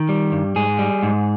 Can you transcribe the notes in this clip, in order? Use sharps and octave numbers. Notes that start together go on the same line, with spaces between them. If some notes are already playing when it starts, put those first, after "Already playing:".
Already playing: D#3
G3
G2
G#2 G#4
G3
G#2